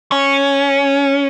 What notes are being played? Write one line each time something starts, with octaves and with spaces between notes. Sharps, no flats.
C#4